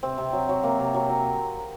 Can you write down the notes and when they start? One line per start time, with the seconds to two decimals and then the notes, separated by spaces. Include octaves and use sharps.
0.03 C3 C4
0.18 C3
0.33 F#3
0.49 F#3
0.63 C3 A#3
0.80 C3
0.94 F#3
1.10 F#3